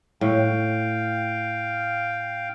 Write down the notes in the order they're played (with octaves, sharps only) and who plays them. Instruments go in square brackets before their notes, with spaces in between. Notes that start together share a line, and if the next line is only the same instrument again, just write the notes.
[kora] A2 [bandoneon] F5 G5